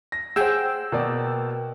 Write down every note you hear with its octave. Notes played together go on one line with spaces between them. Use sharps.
A#6
G#4 C5 F#5 G5 E6
B2 A#3 D5